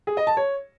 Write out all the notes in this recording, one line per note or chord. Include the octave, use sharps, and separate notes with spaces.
G#4
D#5
A5
C#5